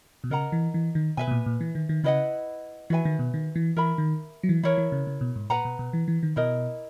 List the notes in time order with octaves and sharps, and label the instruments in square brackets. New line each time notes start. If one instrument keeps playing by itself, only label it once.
[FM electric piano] B2
[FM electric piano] C#3 [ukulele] A#4 D#5 F#5 A#5
[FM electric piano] E3
E3
D#3
[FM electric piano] B2 [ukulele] B4 E5 G#5
[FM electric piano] B2
A#2
A#2
E3
D#3
D#3
[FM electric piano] C#3 [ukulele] E4 B4 D#5 F#5
[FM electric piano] E3 [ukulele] F#4 B4 E5 G#5
[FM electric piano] D#3
B2
D#3
E3
[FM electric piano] E3 [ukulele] A#4 E5 B5
[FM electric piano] D#3
F#3
E3
[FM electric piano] E3 [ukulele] E4 A#4 C#5
[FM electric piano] E3
C#3
C#3
B2
G#2
[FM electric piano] A#2 [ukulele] B4 F#5 A#5
[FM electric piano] B2
B2
E3
E3
D#3
[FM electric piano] B2 [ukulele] E4 A#4 D#5